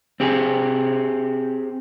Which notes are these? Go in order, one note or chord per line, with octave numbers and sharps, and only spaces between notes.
C4 G4 G#4